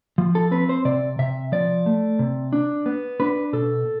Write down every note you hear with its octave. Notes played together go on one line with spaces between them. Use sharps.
F3
A4
C4 B4
C5
C3 D5
C3 E5
F3 D5
A3
C3
D4
B3
D4 B4
B2 A4